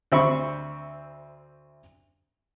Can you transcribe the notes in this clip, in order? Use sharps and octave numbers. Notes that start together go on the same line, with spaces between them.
D2 C4 E5 B5 C#6